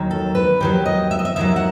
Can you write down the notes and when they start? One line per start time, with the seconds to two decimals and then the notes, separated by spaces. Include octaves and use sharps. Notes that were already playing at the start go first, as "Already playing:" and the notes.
Already playing: D#2 D#3 F#3
0.11 A4
0.35 B4
0.60 D#2 D#3 F#3 G4
0.86 D#5
1.11 E5
1.19 D#5
1.25 E5
1.36 D#2 D#3 F#3 E5
1.56 F#5